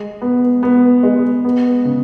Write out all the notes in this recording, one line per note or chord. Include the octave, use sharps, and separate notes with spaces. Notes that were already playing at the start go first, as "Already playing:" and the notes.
Already playing: G#3
B3
B3
G#3
B3
C#3